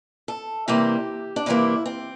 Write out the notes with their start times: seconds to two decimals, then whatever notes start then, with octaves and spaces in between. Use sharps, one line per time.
0.28 A4
0.68 C3 E3 G3 A#3 G4
1.36 D4
1.46 C3 E3 G3 A#3 E4
1.86 C4